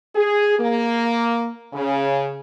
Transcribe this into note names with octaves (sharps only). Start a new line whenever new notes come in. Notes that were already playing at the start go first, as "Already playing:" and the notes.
G#4
A#3
C#3